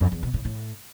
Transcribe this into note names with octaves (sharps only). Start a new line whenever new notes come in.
F2
E2
B2
A2
A2